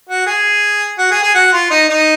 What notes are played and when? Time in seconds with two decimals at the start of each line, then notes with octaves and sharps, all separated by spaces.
0.09 F#4
0.27 G#4
0.98 F#4
1.11 G#4
1.23 G#4
1.34 F#4
1.53 F4
1.71 D#4
1.89 D#4